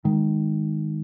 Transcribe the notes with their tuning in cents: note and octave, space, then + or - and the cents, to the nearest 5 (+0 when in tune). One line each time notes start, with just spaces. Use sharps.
D#3 +0 G#3 +0